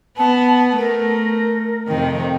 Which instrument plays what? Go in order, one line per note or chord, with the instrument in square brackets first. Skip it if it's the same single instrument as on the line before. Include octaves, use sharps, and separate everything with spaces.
[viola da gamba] B3 [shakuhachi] A5
[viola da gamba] A3 [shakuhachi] A#4
[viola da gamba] F2 C3 D#3